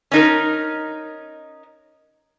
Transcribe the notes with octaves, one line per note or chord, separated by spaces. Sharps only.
C#4 D#4 A#4